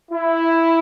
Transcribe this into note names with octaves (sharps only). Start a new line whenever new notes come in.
E4